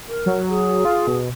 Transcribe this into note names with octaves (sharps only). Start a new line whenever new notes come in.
A#4
F#3
G#4
F4
B2